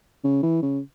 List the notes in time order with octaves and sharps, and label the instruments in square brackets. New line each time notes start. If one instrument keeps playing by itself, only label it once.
[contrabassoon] C#3
E3
C#3